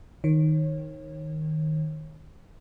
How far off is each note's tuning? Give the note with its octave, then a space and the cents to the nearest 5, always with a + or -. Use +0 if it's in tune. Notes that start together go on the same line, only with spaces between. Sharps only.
D#3 +0 C#5 -30